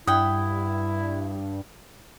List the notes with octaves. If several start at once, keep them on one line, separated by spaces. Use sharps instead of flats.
G2 E4 F#5 G5 D#6